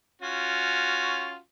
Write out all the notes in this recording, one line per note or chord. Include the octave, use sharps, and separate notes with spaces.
C#4 F4 F#4